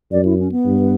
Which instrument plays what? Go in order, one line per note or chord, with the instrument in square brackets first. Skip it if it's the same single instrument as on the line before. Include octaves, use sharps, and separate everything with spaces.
[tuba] F#2 [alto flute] D5
[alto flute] E4
C#4
B3
[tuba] G2